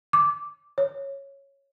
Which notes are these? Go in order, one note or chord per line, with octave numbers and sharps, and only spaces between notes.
D6
C#5